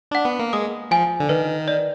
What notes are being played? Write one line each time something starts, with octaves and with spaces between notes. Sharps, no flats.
D4 F#5
B3
A#3
G#3 D#6
F3 G#5
D3
D#3 B4
D5